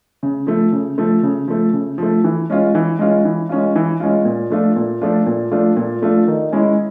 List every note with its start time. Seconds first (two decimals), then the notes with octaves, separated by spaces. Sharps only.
0.23 C#3
0.47 F3 A3
0.73 C#3
0.98 F3 A3
1.23 C#3
1.48 F3 A3
1.73 C#3
1.98 F3 A3
2.24 E3
2.50 G#3 C#4 F4
2.75 E3
2.99 G#3 C#4 F4
3.25 E3
3.49 G#3 C#4 F4
3.76 E3
4.00 G#3 C#4 F4
4.25 A#2
4.50 F3 A3 D4 F4
4.76 A#2
5.01 F3 A3 D4 F4
5.26 A#2
5.51 F3 A3 D4 F4
5.77 A#2
6.02 F3 A3 D4 F4
6.27 D#3
6.52 G#3 C#4 E4